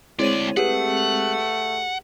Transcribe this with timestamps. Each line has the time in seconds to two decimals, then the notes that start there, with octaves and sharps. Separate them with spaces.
0.19 D2 G#3 C4 E4 C#5 D5 D#7
0.57 A3 G4 G#4 B4 F#5